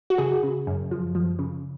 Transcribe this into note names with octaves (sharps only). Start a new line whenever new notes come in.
F#4
C#3 G#4
C#3
F#2
F3
F3
C#3